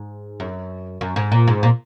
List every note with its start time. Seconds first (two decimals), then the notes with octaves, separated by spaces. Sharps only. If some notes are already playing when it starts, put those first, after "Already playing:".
Already playing: G#2
0.40 F#2
1.01 F#2
1.16 G#2
1.32 A#2
1.48 G#2
1.63 A#2